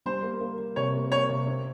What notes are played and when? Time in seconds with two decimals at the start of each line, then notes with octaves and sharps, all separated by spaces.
0.06 G3 C5
0.23 A#3
0.41 A#3
0.58 A#3
0.76 C3 C#5
0.94 A#3
1.12 A#3 C#5
1.30 C3
1.47 C4